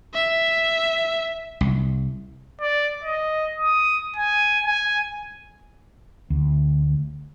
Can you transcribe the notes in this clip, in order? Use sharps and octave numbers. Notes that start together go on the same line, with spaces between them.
E5
C2
D5
D#5
D#6
G#5
G#5
D2